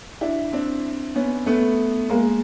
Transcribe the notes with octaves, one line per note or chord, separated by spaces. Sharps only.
D4 E4
C4 D4
B3 C#4
A3 B3
G#3 A#3